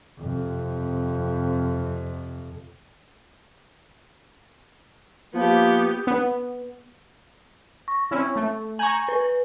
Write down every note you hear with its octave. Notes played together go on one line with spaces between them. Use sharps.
F2 C3
F3 A#3 B3 G4
B3
C#6
C4 C#4 E4
A3
G#5 A#5 C#6 G6 F#7
B4